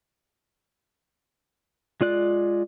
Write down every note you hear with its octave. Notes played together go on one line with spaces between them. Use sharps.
G#3 F4 D5 F#6